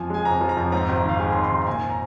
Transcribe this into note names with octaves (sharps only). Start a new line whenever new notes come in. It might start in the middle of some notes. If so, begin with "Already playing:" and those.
Already playing: F2 F3 G#5
G#3 G#5
F2 A#5
F3
A#5
F2
G#2 A#5
G#1
A#5
D#3 F5
G#3 G#5
C6
G#2
C6
G#1 A#5
A#5
A#2 G#5
A#5